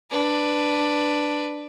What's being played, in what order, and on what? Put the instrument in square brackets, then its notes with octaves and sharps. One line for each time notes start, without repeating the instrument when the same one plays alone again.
[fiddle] D4 B4